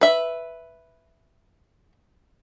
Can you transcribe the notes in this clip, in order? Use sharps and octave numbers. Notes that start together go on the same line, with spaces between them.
B4 E5